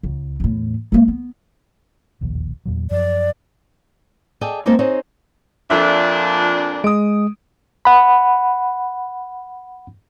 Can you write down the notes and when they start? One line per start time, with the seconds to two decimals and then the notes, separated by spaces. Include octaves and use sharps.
0.03 C#2
0.40 E2 A2
0.92 G#3 A#3
1.08 B3
2.21 E1 A#1 D#2
2.65 E2 A#2 F#3
2.91 F#2 F3 F#3 D5
4.41 G#4 A4 D5 D#5 G5
4.66 G#3 A#3 C4 D#4 A4 A#4
4.79 C4 D#4 G#4 C5 C#5
5.70 F2 A#2 F3 D4 A4 E5
6.84 G#3 D#6 D7
7.85 F#5 B5